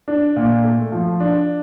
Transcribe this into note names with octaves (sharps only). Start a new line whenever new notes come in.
D4
A#2
A3
F3
D4